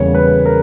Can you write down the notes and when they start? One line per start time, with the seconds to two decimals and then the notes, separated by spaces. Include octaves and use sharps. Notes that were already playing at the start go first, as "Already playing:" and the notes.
Already playing: E2 C#3 G3 A#3 C#5
0.15 B4
0.46 A#4